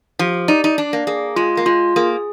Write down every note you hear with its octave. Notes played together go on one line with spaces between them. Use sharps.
F3 G4
D#4 D5
D#4
D4 D5
A#3
A#3 G#4
G#3 F4
A#3
G#3 F4
A#3 G#4